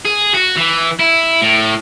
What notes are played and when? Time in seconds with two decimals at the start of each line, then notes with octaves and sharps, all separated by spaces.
0.05 G#4
0.34 F#4
0.57 E3
0.99 E4
1.42 A2